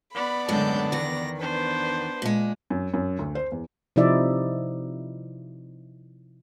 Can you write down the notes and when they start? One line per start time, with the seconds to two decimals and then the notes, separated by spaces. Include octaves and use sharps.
0.14 B3 D5 B5
0.48 F#2 A2 D3 G#3 A5 G6
0.92 E2 D#3 A#6
1.41 B3 D4 B4 C5
2.22 A#2 G#3
2.70 F#2
2.94 F#2
3.19 D2
3.35 C5
3.52 E2
3.96 C3 F3 D#4 E4 D5 E5